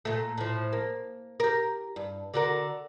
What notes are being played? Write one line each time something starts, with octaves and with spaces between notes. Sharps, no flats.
A#2 A3
A2 F3
A#3
G4 A#4
G2
D3 F#4 A#4